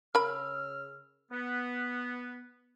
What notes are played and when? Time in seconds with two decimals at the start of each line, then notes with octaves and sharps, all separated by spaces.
0.15 C#3 A#4 B5 E6 F6
1.31 B3